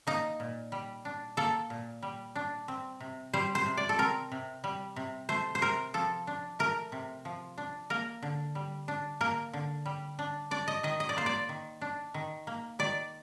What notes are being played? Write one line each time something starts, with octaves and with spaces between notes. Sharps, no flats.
A#3 D#4
A#2
G3
D4
A#3 A4
A#2
G3
D4
C4
C3
G3 C5
C5
C3
D5
A4
C4 A#4
C3
G3
C3
A3 C5
C5
C3 A#4
F3 A4
D4
A3 A#4
C3
F3
D4
A#3 A#4
D3
G3
D4
A#3 A#4
D3
G3
D4
D4 D5
D#5
D#3 D#5
D#5
D5
A#3 C5
D5
D#3
D4
D#3
A#3
D#3 D5